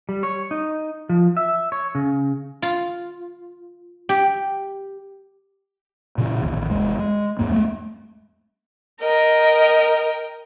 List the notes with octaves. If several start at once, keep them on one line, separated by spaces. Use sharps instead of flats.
G3
C#5
D#4
F3
E5
C#5
C#3
F4
G4
A#2 C#3 E3
A1 D#2
F1 G#3
G#3
E2 G#2 A#3
G#3 A3
A#4 D#5 G5